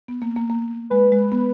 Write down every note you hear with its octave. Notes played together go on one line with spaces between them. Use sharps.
B3
A#3
A#3
A#3
G#3 B4
G#3
B3